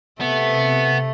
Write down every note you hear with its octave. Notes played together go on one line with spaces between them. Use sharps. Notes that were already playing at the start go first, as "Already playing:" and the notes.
C3 A3 B3